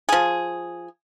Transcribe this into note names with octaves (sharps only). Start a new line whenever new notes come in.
F3 G#4